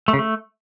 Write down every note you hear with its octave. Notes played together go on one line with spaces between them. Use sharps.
A3
C#3
A3